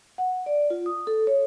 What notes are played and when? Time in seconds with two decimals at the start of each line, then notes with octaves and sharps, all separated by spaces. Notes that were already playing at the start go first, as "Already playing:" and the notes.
0.18 F#5
0.46 D5
0.70 F4
0.86 D#6
1.07 A4
1.27 C#5